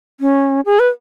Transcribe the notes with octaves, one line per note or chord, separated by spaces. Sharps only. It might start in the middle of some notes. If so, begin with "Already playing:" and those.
C#4
G#4
B4